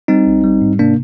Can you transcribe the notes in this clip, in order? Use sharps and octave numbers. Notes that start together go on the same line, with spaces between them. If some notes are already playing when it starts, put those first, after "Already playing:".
G3 C4 D#4
A#1
G3
G#2
C3 A#3 D4